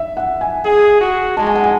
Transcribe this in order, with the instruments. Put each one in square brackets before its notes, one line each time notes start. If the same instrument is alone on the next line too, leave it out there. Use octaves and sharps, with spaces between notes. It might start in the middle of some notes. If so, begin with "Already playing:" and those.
Already playing: [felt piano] E5
F#5
G#5
[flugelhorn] G#4 [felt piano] G#5
[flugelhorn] F#4
[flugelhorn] G#3 [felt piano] A5
[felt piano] G#5
F#5
G#5